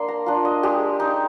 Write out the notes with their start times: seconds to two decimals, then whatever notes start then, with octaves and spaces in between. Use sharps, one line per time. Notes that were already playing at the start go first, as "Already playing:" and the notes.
Already playing: A#3 D4 C6
0.08 A#5
0.26 D4 F4
0.45 D#5
0.63 G#3 G4
1.00 D#4